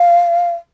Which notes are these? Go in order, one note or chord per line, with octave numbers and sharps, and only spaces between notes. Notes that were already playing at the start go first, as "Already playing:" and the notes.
Already playing: F5